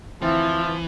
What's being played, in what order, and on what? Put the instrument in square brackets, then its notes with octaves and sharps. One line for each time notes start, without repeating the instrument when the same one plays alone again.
[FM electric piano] D2 C4 A6 [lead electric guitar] E3 [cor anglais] F3 [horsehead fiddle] E4 E5